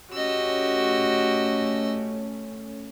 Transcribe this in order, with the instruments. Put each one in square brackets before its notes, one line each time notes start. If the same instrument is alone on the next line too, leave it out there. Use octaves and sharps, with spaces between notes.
[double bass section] A3 C#4 [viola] F#4 G4 [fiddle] D#5 E6